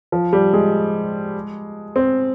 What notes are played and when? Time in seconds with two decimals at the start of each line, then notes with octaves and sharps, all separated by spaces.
0.12 F3
0.33 G3
0.53 G#3
1.96 C4